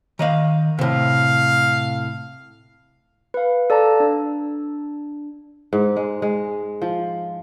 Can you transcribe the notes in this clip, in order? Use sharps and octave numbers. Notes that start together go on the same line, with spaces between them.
D#3 D#5 F5
A2 C3 F5
B4 F5
A4 D5 F5 A5 A#5
D4
G#2
G#3
G#3
F3